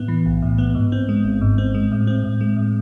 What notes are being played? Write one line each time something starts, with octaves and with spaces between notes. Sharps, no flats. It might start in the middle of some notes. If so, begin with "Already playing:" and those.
Already playing: A2 B3
E3
B1
A2
B3
G#2
C4
G#3
G#1
G#2
C4
G#3
A2
C4
A2
G#3
A2